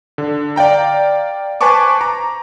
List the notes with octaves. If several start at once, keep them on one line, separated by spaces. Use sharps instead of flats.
D3
D5 F5 G5 A#5
B4 C5 G#5 A5 C#6 D6
A#5